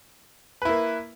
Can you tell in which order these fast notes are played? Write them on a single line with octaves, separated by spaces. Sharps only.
B4 E4 A#3